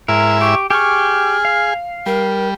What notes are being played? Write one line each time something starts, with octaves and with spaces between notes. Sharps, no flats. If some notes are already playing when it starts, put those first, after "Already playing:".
G#2 E4 A#4 E5
G4 C#6
G4 G#4 C#6 F6
F5
G3 A#4